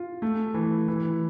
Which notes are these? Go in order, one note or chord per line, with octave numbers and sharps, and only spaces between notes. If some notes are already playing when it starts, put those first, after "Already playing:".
Already playing: F4
A3
E3
E3